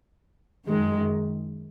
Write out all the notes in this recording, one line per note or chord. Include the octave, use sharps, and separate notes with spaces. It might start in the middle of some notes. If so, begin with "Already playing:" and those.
F#2 D#3 G#3